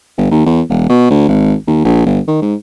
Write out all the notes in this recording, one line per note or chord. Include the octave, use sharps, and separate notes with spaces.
G1
D#2
E2
E1
B2
D2
G#1
D#2
A#1
G1
D#3
G#2